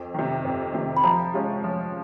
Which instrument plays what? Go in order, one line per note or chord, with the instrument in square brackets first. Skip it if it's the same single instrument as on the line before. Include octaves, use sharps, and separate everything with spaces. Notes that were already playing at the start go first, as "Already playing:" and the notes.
Already playing: [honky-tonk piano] F2
C3 D#3
F2
C3 D#3
[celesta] B5
[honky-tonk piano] F3 [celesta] A#5
[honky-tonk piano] G#3 C#4 F4
F3